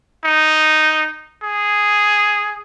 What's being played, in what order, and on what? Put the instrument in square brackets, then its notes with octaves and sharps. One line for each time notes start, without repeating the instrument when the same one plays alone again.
[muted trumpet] D#4
G#4